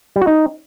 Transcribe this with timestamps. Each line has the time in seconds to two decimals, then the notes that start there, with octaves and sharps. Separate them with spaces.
0.16 G3
0.21 F#4
0.27 D#4